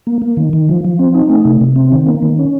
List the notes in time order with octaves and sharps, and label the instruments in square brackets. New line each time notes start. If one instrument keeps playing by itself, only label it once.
[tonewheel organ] A#3
A#3
D#3
D#3
F3
F3
C4
D#4
A3
C3
C3
C4
D#3
A#3
D#3
C#4